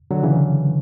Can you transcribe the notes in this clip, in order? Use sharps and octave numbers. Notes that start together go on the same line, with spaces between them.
D3 F#3
C#3 E3